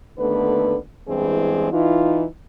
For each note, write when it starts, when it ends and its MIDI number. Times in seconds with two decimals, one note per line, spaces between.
0.19 0.77 39
0.19 0.77 50
0.19 0.77 57
0.19 0.77 59
0.19 0.77 71
1.08 1.71 40
1.08 1.71 43
1.08 1.71 52
1.08 1.71 56
1.08 1.71 60
1.08 1.71 68
1.72 2.25 52
1.72 2.25 63
1.72 2.25 65